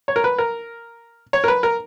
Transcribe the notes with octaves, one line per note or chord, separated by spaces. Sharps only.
C#5
A#4
B4
A#4
C#5
A#4
B4
A#4